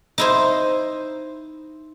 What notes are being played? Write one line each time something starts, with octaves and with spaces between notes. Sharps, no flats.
D#4 E4 C5